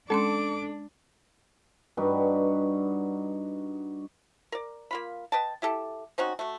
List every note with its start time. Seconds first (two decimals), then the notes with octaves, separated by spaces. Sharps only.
0.10 G#3 C#4 D4 A4 C6 D6
1.97 G2 D#4 F#4 B4
4.52 A#4 D5
4.91 A#3 F4 B5
5.32 B4 D#5 G5 A5
5.62 E4 G4 A4
6.18 C4 C#4 D#4 F#4
6.39 A3 F#4